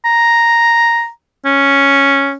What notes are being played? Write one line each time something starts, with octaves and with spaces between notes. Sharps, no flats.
A#5
C#4